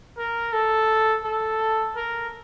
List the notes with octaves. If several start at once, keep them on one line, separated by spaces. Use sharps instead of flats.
A#4
A4
A4
A#4